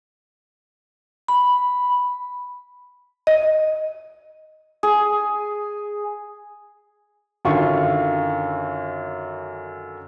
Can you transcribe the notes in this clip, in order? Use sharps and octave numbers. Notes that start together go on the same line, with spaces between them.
B5
D#5
G#4
F#2 D3 D#3 F4 C#6